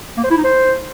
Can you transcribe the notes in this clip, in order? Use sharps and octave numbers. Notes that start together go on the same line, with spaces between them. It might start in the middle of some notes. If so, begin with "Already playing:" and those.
A#3
C5
E4
D#4
C5